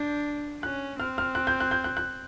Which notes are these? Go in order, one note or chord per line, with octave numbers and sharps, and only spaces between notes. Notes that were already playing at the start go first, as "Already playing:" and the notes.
Already playing: D4 G6
C#4 F#6
C4 F6
F6
F#6
G6
F#6
G6
F#6
F#6